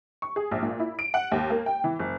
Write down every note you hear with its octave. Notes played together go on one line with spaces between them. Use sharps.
C#6
G#4
A#1
A#2
E4
D7
F#5
D#2
A#3
G5
E3
F#1